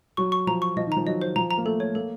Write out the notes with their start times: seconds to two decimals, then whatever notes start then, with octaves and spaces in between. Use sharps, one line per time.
0.17 F#3 C#6
0.32 C#6
0.47 F3 A#5
0.62 C#6
0.77 F3 D#5
0.87 D#3
0.92 F3 A#5
1.07 F#3 D#5
1.22 C5
1.36 F3 A#5
1.51 A#5
1.58 A#3
1.65 A3 A4
1.80 C#5
1.95 A#3 A4